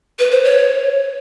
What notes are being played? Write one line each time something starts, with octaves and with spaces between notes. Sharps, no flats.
B4
C5
C#5